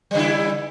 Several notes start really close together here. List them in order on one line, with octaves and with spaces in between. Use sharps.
G3 C#3 E4